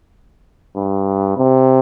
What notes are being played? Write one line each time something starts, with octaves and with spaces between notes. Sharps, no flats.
G2
C3